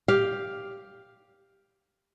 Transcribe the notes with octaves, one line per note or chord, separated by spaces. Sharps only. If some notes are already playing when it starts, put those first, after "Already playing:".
G4 F5